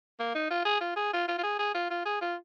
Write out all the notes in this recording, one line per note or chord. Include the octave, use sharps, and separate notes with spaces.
A#3
D#4
F4
G#4
F4
G#4
F4
F4
F4
G#4
G#4
F4
F4
G#4
F4